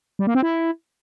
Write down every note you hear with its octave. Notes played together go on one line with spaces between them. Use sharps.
G3
A#3
C4
E4